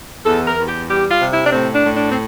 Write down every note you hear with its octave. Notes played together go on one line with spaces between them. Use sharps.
E2 A4
A#4
E2
G4
G3 G4
F4
C3
E4
D4
A2 C4
D4
A2
D4
C4